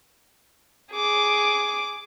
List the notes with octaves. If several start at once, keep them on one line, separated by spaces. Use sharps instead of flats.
G#4 D6